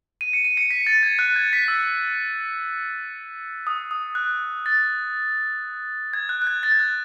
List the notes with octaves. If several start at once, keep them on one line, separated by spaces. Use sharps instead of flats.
D#7
C#7
D#7
C#7
B6
A6
G#6
F#6
G#6
B6
E6
D#6
D#6
F#6
A6
G#6
F#6
F#6
G#6
A6
G#6
F#6